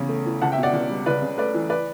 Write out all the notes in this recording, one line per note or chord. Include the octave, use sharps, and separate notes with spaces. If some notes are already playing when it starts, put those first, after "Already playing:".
Already playing: E2 C#3
A3
E3
C#2 F#5 A5
E5 G5
B2
D5 F#5
C#2
G3
C#2 B4 D5
C#3
A3 B4 D5
E3
B4 D5